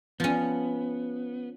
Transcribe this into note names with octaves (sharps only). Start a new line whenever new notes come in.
F3 B3 C#4